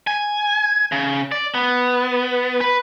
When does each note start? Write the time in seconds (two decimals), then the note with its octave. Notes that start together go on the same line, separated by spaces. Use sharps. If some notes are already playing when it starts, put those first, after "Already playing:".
0.07 G#5
0.92 C#3
1.32 D5
1.55 B3
2.61 B4